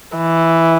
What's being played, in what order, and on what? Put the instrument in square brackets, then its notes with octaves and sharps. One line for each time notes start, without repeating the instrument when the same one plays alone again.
[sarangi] E3